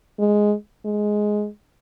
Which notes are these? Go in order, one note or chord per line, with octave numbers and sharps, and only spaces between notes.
G#3
G#3